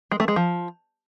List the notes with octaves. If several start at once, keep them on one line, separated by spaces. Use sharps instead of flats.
G#3
A3
G#3
F3